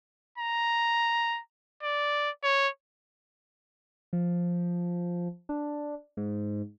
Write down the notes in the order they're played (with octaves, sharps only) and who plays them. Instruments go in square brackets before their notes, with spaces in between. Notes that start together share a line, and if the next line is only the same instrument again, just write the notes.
[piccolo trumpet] A#5
D5
C#5
[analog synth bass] F3
D4
G#2